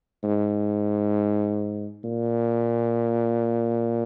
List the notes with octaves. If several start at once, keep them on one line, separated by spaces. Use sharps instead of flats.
G#2
A#2